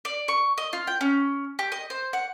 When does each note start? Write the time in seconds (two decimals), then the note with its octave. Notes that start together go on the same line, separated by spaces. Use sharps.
0.05 D5
0.28 C#6
0.58 D#5
0.73 F4
0.87 G5
1.01 C#4
1.59 G4
1.72 D#5
1.90 C5
2.13 F#5